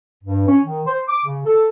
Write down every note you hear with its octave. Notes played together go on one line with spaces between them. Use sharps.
G2
C#4
D#3
C5
D6
C#3
A4